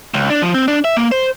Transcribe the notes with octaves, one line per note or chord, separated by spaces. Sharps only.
C#2
D4
F3
C4
D4
E5
A#3
C5